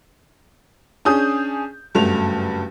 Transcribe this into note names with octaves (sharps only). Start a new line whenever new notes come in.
C#4 D4 G#4 D#6 G6
F#1 G2 F#3 A3 F7